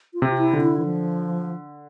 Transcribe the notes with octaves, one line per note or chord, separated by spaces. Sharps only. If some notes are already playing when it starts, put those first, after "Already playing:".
F4
C3
E4
D3
E4
E3
F3